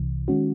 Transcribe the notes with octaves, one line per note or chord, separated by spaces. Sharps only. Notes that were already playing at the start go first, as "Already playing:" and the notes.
Already playing: C2 C3 E3
D#3 G#3 C#4 F#4